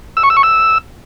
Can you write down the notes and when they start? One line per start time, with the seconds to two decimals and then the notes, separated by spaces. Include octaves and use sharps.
0.17 E6
0.23 C#6
0.30 E6
0.37 C#6
0.43 E6